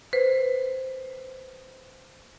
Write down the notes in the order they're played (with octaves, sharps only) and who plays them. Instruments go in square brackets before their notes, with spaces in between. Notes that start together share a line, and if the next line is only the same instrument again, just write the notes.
[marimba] B4 C5